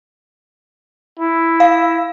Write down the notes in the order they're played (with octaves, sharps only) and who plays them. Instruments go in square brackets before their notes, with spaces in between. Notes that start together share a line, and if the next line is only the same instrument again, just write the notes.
[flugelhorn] E4
[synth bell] F5